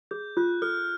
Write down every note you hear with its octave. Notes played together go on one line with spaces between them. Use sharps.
G#4 G6
F4 F#6
A4 F6